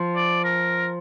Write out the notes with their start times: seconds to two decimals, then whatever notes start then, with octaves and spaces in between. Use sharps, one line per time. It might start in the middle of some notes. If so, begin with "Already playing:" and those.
Already playing: F3
0.16 D5
0.44 A#4